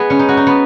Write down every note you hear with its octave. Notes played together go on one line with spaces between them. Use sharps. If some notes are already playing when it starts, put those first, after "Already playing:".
Already playing: G#3 B3
C#4
D#4
F#4
D#4
B3